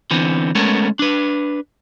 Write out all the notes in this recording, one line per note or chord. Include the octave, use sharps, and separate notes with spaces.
D3 E3 B3 C4
G#3 A3 B3 C#4 A4 A#4
D4 B4